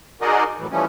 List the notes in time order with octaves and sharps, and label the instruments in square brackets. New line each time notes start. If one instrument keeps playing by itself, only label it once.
[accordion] D#4 F#4 G#4 A#4 D5 D#5
F#2 A2 E3
E3 F3 G3 A3 C#4